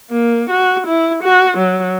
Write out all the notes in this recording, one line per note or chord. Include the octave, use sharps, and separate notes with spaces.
A#3
F#4
E4
F#4
F#3